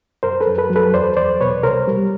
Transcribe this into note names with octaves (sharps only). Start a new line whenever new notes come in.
F#2 A#4 C5
A4 B4
F#2
A4 B4
F#3
A4 B4
E2 C5 D5
E2 C5 D5
B2 B4 C#5
C2 A#4 C5
G3